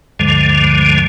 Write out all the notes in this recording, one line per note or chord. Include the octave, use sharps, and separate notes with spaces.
D2 G2 D3 F3 G#3